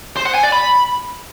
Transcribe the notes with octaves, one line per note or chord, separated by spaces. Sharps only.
C5
F#5
G#5
D5
B5